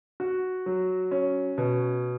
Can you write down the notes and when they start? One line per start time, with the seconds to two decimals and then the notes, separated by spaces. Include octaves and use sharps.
0.20 F#4
0.66 F#3
1.11 C#4
1.58 B2